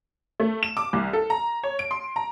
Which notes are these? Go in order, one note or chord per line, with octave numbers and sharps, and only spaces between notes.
A3
E7
D6
C2
A4
A#5
C#5
D7
C6
A#5